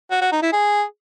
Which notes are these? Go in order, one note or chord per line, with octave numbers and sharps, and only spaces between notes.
F#4
F#4
D#4
E4
G#4